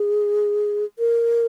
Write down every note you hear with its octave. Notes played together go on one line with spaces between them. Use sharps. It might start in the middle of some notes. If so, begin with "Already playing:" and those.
Already playing: G#4
A#4